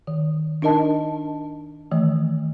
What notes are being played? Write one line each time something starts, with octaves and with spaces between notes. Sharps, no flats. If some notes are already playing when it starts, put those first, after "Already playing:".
D#3
D4 D#4 A#4 D#5 A5
D#3 E3 A3